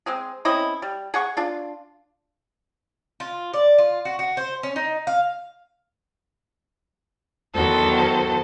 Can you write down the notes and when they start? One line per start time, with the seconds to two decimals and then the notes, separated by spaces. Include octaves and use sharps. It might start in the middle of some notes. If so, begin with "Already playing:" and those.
0.06 G#3 C4 G#4
0.45 C4 C#4 E4 D#5
0.82 G3
1.14 G#4 F#5 C#6
1.37 D4 F4
3.20 F4
3.54 D5
3.78 F4
4.05 F#4
4.19 F#4
4.37 C5
4.63 C#4
4.76 D#4
5.07 F5
7.54 E2 D#3 F#3 A4 C5